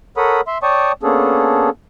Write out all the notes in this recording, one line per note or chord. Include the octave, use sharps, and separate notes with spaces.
A4 A#4 C#5 F#5 B5 D#6
E5 C6
C#5 D5 G5 A5 C#6 D#6
A#3 B3 C#4 D4 G#4 A4